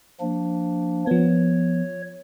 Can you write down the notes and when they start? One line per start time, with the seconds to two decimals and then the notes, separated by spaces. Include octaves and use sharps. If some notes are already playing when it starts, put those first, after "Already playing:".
0.21 F3 A#3 D4
1.07 F3 B3 C#5